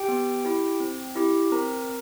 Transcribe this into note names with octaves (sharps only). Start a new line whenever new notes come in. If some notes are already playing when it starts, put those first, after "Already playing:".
Already playing: G4 G5
B3
E4 G4
C4
E4 G4
C4 A#4 A#5